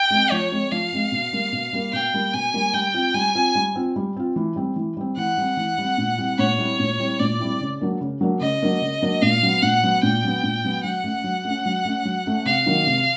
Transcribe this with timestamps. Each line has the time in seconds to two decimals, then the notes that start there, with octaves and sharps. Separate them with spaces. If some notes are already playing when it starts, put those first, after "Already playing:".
Already playing: G5
0.10 G#3 C4
0.31 F3 C#5
0.52 G#3 C4
0.72 F3 F5
0.93 G#3 C4
1.12 B2
1.33 G3 A#3
1.52 B2
1.73 G3 A#3
1.93 B2 G5
2.14 G3 A#3
2.33 B2 G#5
2.54 G3 A#3
2.74 G3 G5
2.94 C4 F4
3.14 G3 G#5
3.35 C4 F4
3.55 G3
3.76 C4 F4
3.96 G3
4.17 C4 F4
4.36 E3
4.56 G3 C4
4.76 E3
4.97 G3 C4
5.17 E3 F#5
5.38 G3 C4
5.57 E3
5.78 G3 C4
5.98 A#2
6.18 G3 C4 E4
6.39 A#2 C#5
6.58 G3 C4 E4
6.79 A#2
6.99 G3 C4 E4
7.19 A#2 D5
7.39 G3 C4 E4
7.61 C#3
7.81 F#3 A#3 D4
8.01 C#3
8.21 F#3 A#3 D4
8.41 C#3 D#5
8.62 F#3 A#3 D4
8.82 C#3
9.02 F#3 A#3 D4
9.22 A#2 F5
9.43 F#3 B3
9.62 A#2 F#5
9.83 F#3 B3
10.03 A#2 G5
10.24 F#3 B3
10.43 A#2
10.64 F#3 B3
10.84 F#3 F#5
11.04 A3 C#4
11.24 F#3
11.45 A3 C#4
11.66 F#3
11.85 A3 C#4
12.05 F#3
12.26 A3 C#4
12.46 C3 F5
12.66 D#3 F#3 A#3
12.87 C3